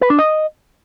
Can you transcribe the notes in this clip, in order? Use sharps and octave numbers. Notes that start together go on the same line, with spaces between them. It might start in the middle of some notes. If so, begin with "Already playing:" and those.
B4
D4
D#5